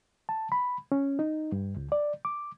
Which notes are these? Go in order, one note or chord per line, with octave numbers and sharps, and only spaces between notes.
A5
B5
C#4
D#4
G2
C#2
D5
D6